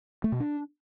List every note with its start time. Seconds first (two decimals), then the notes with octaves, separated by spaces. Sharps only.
0.24 A3
0.32 B2
0.40 D4